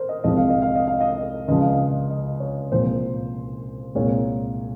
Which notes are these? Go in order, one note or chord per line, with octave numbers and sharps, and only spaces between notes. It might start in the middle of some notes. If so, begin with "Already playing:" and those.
Already playing: A#4 C5
D#5
C2 C3 F3 G#3 D#5
F5
D#5
F5
D#5
F5
D#5
C#2 C#3 F3 G#3 D#5
F5
D#5
D#5
C#5
C2 A#2 F3 G#3 C5
C2 A#2 G#3 C#5